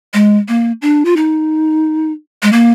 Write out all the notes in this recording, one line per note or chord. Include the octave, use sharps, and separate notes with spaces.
G#3
A#3
D4
F4
D#4
G#3
A#3